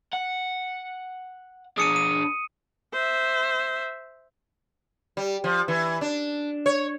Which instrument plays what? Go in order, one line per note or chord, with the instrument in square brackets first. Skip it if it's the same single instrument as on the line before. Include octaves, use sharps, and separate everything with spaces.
[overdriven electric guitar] F#5
[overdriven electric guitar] D4 G#4 [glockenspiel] D#6 C#7 D#7
[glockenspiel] D#7
[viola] C5 E5
[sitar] G3
F3
E3
D4
C#5